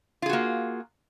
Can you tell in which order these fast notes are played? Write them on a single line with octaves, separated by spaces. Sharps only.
F4 G#4 F#4 A#3